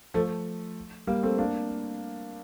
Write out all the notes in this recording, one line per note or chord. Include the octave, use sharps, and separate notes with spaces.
F3 A3
G3 A#3
A3 C4
A#3 D4